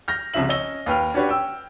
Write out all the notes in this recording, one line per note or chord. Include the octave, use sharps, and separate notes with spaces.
F6 G6 A#6
C2 C#3 F3 E5 F#7
C#4 D#5 E6 A#6 G7
D#2 B4 G5 F6
C#4 D4 F#4 G4 B4 C#5
G5 E6